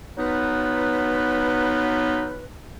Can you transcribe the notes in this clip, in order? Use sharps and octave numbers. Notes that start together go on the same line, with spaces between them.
F#3 B3 D#4 F4 B4